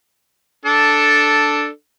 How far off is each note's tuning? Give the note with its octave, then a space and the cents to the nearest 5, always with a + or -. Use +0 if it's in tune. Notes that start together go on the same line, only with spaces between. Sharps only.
D4 +0 A4 +0